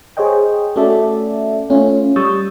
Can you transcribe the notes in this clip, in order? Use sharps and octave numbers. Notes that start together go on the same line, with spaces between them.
G#4 C5 C#5 D#5 G5
A3 C#4 F#4 A4 D5 E5
A3 C#4 F4
G3 C#6 D#6 E6 G6 A6